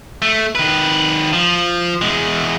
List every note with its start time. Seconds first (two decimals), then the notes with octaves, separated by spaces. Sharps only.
0.22 A3
0.55 D#3 B4
1.33 F3
2.02 E2 G#3